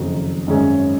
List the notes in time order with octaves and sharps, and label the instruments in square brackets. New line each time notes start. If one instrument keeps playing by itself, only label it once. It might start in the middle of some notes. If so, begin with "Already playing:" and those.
Already playing: [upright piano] F#1 F2 D#3 F#3
G#1 F#2 D#3 G#3 C#4